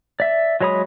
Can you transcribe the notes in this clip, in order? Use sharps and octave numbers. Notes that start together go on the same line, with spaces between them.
D5 E5
F#3 G#3 C#5 B5 D#6